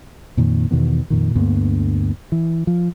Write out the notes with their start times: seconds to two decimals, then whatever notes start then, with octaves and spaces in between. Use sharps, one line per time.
0.37 F2 A#2 D#3
0.71 E2 B2 D#3 B3
1.10 F2 A#2 D#3
1.35 D2 G2 A#3 B3
2.32 E3
2.67 F3